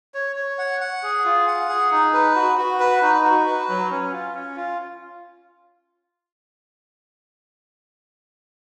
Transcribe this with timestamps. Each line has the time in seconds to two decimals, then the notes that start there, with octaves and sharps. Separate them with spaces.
0.14 C#5
0.36 C#5
0.59 F#5
0.81 F#5
1.03 G#4
1.25 F4
1.47 F#5
1.69 G#4
1.92 D#4
2.13 B4
2.35 F#4
2.58 F#4
2.80 B4
3.02 D#4
3.24 F#4
3.46 B4
3.69 F#3
3.90 C#4
4.13 F4
4.35 C#4
4.56 F4